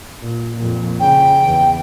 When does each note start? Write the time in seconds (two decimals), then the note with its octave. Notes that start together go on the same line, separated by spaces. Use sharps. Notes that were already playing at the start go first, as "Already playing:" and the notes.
0.22 A#2
0.57 F2 A#2
1.00 C#3 G5
1.44 E2